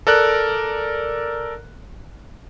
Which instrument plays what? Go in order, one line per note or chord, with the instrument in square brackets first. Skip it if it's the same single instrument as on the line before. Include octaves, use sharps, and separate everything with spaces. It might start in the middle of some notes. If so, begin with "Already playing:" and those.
[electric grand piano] A4 A#4 D5 F#6